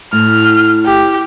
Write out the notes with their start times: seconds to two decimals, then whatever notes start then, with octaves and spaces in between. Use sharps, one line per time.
0.13 A2 F6
0.85 G4